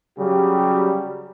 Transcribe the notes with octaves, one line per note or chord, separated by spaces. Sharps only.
C#3 F#3 G3 G4